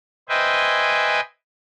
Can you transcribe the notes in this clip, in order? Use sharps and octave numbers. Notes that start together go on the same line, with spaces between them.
B4 C5 D#5 E5 G5 G#5